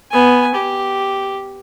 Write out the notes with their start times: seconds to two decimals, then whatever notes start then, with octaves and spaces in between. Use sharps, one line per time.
0.12 B3 G#5
0.55 G4